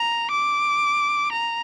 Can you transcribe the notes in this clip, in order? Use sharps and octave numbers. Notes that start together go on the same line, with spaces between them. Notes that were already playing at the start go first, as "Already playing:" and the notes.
Already playing: A#5
D6
A#5